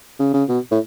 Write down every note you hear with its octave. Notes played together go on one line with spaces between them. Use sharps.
C#3
C#3
B2
A2